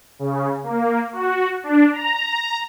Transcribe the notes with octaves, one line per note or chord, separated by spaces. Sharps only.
C#3
A#3
F#4
D4
A#5